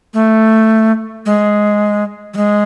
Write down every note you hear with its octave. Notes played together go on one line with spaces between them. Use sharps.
A3
G#3
F#3
G#3